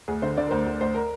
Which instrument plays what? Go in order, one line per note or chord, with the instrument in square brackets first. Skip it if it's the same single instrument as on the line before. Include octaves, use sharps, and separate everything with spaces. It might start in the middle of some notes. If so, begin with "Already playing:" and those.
[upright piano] D2 G#4
D3 C5
D3 D5
A#4
D2 C5
D2
D2 C5
A#4